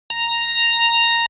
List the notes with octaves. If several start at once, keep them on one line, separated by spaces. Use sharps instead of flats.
A#5